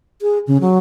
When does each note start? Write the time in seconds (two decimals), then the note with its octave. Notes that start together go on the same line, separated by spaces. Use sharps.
0.22 G#4
0.47 C#3
0.61 F#3